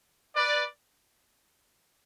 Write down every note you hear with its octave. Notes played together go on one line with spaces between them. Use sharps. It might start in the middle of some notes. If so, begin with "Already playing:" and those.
B4 D5